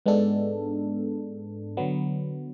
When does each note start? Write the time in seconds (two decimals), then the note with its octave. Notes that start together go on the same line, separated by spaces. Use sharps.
0.06 G#2 G#3 B3 D4 A4
1.77 D3 F#3 B3